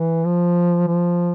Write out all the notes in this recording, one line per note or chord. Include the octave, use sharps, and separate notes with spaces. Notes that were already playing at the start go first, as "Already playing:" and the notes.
Already playing: E3
F3
F3